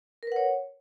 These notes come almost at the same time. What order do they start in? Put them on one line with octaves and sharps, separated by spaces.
A#4 B4 F#5 C#5